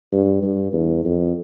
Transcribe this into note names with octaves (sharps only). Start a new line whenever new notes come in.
G2
G2
E2
F2